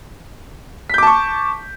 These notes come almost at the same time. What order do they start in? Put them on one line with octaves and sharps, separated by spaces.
B6 G6 D6 A5 C#6